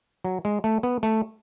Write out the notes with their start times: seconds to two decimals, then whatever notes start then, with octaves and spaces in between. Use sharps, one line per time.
0.24 F#3
0.45 G#3
0.64 A3
0.83 B3
1.03 A3